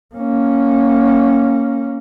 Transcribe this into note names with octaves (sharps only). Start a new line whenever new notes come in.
A#3 C#4